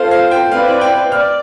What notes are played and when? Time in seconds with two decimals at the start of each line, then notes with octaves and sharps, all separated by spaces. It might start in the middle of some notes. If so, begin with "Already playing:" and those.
Already playing: C4 F4 A4 C5 F5
0.11 F5
0.31 G5
0.51 C4 E4 B4 D5 F5
0.81 G5
1.11 D5 F6